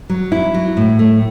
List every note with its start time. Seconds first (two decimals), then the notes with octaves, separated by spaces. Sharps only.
0.10 F#3
0.32 E4
0.54 F#3
0.77 A2
0.99 A3